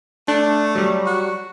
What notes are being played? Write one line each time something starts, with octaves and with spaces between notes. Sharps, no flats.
A3 D4
F#3 G3
F#4